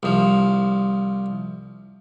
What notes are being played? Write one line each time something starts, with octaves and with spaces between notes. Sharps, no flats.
C2 F3